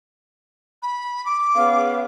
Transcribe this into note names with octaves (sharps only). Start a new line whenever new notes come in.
B5
D6
B3 C#4 G#4 F5